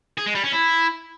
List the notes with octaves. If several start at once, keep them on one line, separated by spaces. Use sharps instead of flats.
G#4
G#3
G3
C#4
E4